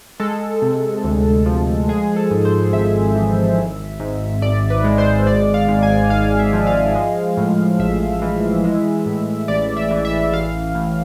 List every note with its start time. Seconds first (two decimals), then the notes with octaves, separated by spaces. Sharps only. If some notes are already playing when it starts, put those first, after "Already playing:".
0.20 G#3 A4
0.62 C3
1.04 D2
1.46 F3
1.89 G#3 G#4
2.16 A4
2.31 G#2
2.45 C5
2.73 G#1 E5
3.15 E3
3.58 G#1
4.00 G#2
4.42 G#1 D5
4.70 B4
4.84 G#3
4.98 C5
5.27 G#1 D5
5.54 F5
5.68 G#2
5.83 G#5
6.10 G#1 F5
6.39 E5
6.53 F3
6.67 F5
6.95 G#3
7.37 A2
7.79 A1 E5
8.22 E3
8.64 G#3
9.06 A2
9.48 A1 D5
9.77 E5
9.91 E3
10.05 E5
10.33 A1 F5
10.75 A2